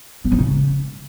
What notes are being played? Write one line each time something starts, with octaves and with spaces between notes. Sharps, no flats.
B3
D#4
C#3